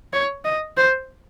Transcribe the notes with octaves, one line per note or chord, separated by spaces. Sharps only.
C#5
D#5
C5